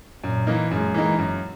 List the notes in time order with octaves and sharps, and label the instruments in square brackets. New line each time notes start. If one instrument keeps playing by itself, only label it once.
[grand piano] F#2 [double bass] A#2
[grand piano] E3 A#3 D#4
[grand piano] F#2 [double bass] G#3
[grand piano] E3 A#3 D#4
F#2